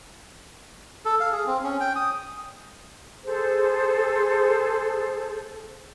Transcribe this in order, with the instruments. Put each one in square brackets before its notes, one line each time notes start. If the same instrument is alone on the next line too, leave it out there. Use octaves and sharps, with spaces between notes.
[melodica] A4
F5
G#4
C4
C#4
G5
D#6
[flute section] G#4 A4 C5